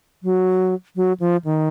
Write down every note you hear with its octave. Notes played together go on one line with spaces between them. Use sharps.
F#3
F#3
F3
D#3